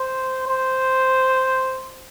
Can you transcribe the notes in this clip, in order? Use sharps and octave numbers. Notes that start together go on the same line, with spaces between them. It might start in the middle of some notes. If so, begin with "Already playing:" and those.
Already playing: C5
C5